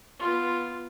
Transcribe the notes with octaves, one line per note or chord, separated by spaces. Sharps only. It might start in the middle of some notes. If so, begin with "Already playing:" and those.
B3 F4